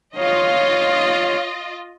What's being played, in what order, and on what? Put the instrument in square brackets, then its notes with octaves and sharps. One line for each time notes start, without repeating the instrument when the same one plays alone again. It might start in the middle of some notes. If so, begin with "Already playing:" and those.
[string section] F4 D#5 [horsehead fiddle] C#5 F5